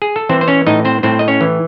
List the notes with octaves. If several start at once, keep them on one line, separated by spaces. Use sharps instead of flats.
G#4
A4
E3 C4 C5
C5
C#4 C#5
A2 D#4 D#5
C4 C5
A2 C4 C5
D#5
C#4 C#5
E3